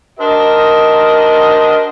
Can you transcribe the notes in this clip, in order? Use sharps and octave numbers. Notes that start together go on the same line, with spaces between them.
D4 F#4 A#4 C5 D#5